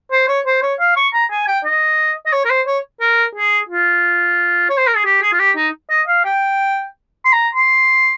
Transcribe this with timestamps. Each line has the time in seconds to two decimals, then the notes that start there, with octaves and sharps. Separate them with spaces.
0.12 C5
0.28 C#5
0.46 C5
0.62 C#5
0.80 F5
0.96 C#6
1.13 A#5
1.31 G#5
1.47 G5
1.65 D#5
2.26 D#5
2.32 C#5
2.45 A#4
2.50 C5
2.67 C#5
3.01 A#4
3.35 G#4
3.69 F4
4.69 C#5
4.78 C5
4.87 A#4
4.96 G#4
5.05 G4
5.22 G#4
5.33 F4
5.39 G4
5.56 D#4
5.90 D#5
6.08 F5
6.24 G5
7.25 C6
7.32 A#5
7.55 C6